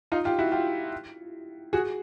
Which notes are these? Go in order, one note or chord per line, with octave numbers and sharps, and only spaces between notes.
D#4 F4
F4 G4
E4 F#4
F4 G4
F#4 G#4